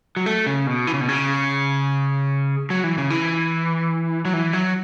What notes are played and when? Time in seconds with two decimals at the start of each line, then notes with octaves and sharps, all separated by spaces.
0.17 F#3
0.26 A3
0.47 C#3
0.67 B2
0.87 E3
0.94 C#3
1.01 B2
1.09 C#3
2.70 F#3
2.84 E3
2.98 C#3
3.10 E3
4.25 F#3
4.34 E3
4.53 F#3